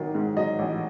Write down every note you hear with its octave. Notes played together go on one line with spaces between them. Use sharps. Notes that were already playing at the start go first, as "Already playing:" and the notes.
Already playing: A1 D#3 F#3
G#2
F#3 D#5
A1